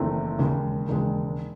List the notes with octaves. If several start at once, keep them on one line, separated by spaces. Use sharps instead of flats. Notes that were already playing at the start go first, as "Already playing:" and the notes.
Already playing: F#1 E2 D#3 A3 C4
E1 D#2 C#3 G#3
E1 D#2 C#3 G#3